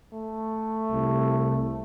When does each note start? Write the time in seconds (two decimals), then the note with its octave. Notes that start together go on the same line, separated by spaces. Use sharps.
0.13 A3
0.91 C2